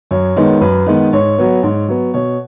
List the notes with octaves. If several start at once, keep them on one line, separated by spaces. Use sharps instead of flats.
F#2 C#5
D#3 G#3 B3
F#2 B4
D#3 G#3 B3
G#2 C#5
F#3 B3
G#2
F#3 B3
B2 C#5